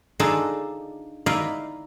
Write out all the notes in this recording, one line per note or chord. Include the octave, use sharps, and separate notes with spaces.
D4 D#4 F4 G#4 A4 D5
D#4 E4 D5 D#5 F5